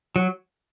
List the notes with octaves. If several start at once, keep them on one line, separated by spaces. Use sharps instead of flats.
F#3